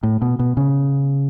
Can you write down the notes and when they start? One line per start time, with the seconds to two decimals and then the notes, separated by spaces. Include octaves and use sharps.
0.03 A2
0.22 B2
0.39 B2
0.57 C#3